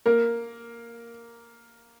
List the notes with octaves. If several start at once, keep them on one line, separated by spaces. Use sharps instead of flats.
A#3 A#4